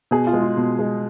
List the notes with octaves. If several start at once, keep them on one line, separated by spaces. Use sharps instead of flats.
B2 G#4
F4
G#3
F4
B2
G#3